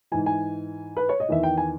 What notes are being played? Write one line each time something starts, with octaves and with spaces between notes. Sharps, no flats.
G#2 E3 G#5
G#5
B4
C#5
D#5
E2 D#3 E5
G5
G#5